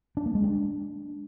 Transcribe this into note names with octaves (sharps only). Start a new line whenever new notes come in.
D4
A#3
G#3
D4